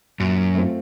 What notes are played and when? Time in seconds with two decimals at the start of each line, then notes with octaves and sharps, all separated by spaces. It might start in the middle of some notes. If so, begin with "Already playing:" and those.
0.20 F#2 A#2
0.55 A3 C4 F4